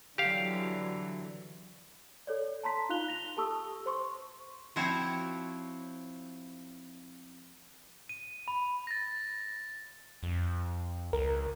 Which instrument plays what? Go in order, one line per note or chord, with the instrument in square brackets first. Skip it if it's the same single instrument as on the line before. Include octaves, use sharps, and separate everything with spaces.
[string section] D3 E3 F#3 [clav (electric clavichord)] G4 F5
[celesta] A4 C#5 D5
A5 A#5 C6 B6
D#4 F4 F5 F#6 F7 G7
A#6 F7 G7
G4 A4 A5 C#6 D#6 E6
C5 C6 C#6
[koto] F3 C4 E4 F#4 C5 C#5
[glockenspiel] D#7
B5
[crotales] A6 A#6
[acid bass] F2
[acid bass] C#2 [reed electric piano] A#4